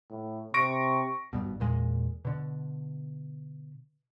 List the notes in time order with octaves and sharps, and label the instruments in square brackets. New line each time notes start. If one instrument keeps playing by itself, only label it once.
[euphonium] A2
[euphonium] C3 [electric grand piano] C#6 A#6 D7
[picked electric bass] G#1 G2 B2
E2 A#2 G#3
B2 D3